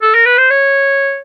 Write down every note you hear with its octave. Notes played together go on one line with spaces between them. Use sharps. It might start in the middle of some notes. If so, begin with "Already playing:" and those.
A4
A#4
B4
C5
C#5